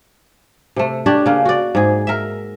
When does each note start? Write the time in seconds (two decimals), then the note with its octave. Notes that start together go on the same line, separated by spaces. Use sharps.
0.76 C3 A3
1.06 D4 G4 C#5
1.26 C#3 A#3
1.45 F#4 D5
1.75 G#2 G#4
2.07 A#4 E5